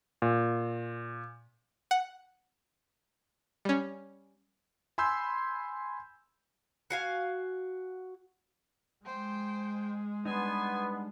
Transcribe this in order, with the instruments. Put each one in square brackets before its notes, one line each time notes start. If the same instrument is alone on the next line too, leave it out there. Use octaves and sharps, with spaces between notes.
[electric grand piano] A#2
[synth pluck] F#5
G3 C#4
[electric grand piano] G#5 B5 C6 E6 G6
[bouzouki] F#4 F5 G#5
[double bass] G#3 [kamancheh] C5 G5
[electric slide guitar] G3 D4 D#4 [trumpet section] B3 [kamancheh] G#5 C6